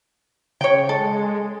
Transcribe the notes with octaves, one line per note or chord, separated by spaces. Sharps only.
C#3 C#5 G5
G#3 A4